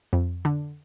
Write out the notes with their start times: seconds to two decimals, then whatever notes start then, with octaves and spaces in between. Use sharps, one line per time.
0.13 F2
0.45 D3